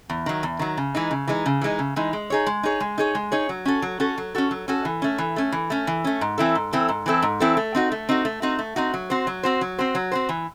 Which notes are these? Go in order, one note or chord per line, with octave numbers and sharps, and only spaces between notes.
E2
D#3 F#3
E2
D#3 F#3
C#3
E3 G#3 D#4
C#3
E3 G#3 D#4
C#3
E3 G#3 D#4
C#3
E3 G#3 D#4
G#3
D#4 G#4 C#5
G#3
D#4 G#4 C#5
G#3
D#4 G#4 C#5
G#3
D#4 G#4 C#5
F#3
C#4 F#4 A4
F#3
C#4 F#4 A4
F#3
C#4 F#4 A4
F#3
C#4 F#4 A4
E3
A3 C#4
E3
A3 C#4
E3
A3 C#4
E3
A3 C#4
G#2
E3 C4 E4 A4
G#2
E3 C4 E4 A4
G#2
E3 C4 E4 A4
G#2
E3 C4 E4 A4
A3
C4 D#4 F#4
A3
C4 D#4 F#4
A3
C4 D#4 F#4
A3
C4 D#4 F#4
F#3
C4 F#4 C5
F#3
C4 F#4 C5
F#3
C4 F#4 C5
F#3
C4 F#4 C5
E3